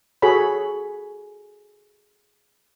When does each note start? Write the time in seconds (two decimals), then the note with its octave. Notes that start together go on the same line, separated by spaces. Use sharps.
0.22 F#4 G#4 A4 C#5 B5